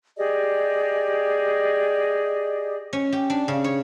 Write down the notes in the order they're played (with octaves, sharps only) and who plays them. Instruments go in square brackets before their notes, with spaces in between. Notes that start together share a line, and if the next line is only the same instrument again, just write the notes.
[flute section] G4 G#4 D5 D#5
[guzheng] C#4
G4
D4
C#3
C#5